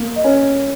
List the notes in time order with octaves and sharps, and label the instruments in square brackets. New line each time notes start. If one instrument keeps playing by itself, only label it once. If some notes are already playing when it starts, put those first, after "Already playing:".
Already playing: [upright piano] A#3
[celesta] D#5
[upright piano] C#4